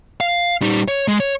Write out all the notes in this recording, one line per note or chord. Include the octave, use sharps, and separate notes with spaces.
F5
G3 D#4
C#5
G#3
C#5